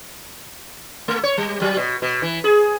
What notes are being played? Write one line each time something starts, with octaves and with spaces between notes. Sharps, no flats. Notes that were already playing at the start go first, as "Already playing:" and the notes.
A3
C#5
G3
F#3
B2
B2
E3
G#4